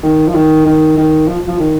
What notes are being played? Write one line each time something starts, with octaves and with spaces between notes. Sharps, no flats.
D#3
F3
D#3
D#3
D#3
F3
F3
D#3